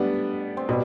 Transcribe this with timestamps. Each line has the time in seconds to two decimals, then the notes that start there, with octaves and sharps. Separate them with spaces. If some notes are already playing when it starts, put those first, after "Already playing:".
Already playing: G3 A3 B3 D4
0.57 C4
0.69 B2 G3